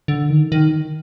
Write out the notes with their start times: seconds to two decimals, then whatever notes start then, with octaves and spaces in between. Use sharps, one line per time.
0.08 D3
0.30 D#3
0.52 D#3